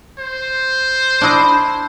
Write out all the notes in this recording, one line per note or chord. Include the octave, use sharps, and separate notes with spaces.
C5
D4 E4 D#5